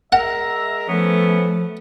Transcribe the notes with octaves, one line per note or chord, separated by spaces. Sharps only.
G#3 A#4 E5 F#5
F3 A3 B3 C#4